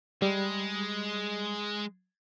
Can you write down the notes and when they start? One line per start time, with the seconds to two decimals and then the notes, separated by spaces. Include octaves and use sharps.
0.22 G3 G#3